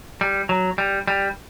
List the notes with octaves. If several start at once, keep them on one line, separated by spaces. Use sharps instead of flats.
G3
F#3
G3
G3